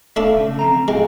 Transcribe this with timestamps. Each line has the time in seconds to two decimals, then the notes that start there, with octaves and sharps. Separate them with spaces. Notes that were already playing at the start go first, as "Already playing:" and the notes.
0.16 A3 D4 A4 F5
0.37 C#3
0.59 F3 C4 A#5
0.88 A2 G#3 F5 G5